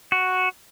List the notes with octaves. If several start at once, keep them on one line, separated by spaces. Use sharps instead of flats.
F#4